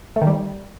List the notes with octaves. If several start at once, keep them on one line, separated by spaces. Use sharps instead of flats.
A3
D#3
G3